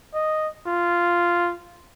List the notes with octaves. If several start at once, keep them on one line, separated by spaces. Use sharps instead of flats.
D#5
F4